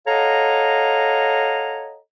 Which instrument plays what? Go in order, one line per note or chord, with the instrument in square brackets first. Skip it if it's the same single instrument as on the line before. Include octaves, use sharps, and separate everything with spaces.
[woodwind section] A4 C#5 D#5 F5 F#5 A#5